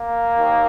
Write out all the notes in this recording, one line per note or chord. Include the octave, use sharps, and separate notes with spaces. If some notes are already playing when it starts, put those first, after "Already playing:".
Already playing: A#3
D#2 D#3